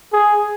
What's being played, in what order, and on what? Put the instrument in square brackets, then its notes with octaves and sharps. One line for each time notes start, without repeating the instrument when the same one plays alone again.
[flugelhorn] G#4